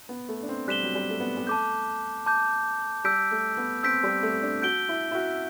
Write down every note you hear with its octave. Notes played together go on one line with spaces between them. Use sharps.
B3
A3
D4
C4
G3 F#6 B6 E7 G7
F#3
G3
A3
B3
G3
A3 A5 D6 G6
A5 D6 G6
G3 E6 G6 B6 D7
A3
B3
C4 E6 G6 B6 D7
G3
A3
D4
F#4 G6 D7 G7
E4
E4
F#4